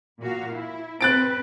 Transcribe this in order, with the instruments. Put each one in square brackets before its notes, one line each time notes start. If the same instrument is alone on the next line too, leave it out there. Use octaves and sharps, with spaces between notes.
[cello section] A#2 F#4 F5
E4
[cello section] C4 B4 [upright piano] F#6 A6 D7